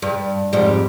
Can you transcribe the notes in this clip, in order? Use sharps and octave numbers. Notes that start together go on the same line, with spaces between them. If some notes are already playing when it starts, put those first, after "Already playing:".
G2
F2 G#2 G3